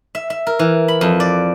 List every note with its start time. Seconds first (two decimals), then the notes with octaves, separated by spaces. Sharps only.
0.15 E5
0.30 E5
0.47 A#4
0.59 E3
0.88 B5
1.01 F2
1.20 D5